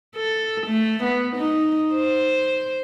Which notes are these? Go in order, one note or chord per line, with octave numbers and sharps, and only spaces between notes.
A4
A3
B3
D#4
C5